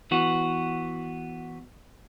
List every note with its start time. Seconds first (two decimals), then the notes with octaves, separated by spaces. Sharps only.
0.11 E3 B3 F#4